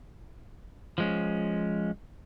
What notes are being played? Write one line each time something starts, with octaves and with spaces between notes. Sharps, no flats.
F3 G#3 C#4